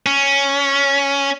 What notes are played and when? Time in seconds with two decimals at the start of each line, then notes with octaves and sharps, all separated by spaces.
0.06 C#4